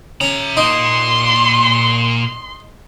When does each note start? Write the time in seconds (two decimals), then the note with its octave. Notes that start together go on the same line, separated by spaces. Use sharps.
0.21 C#4 E5 A#5
0.57 A#2 A#3 D#4 C6